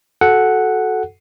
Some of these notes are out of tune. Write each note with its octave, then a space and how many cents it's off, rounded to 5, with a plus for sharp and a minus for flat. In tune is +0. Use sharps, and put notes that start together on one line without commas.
F#4 +0 A4 -15 F#5 +0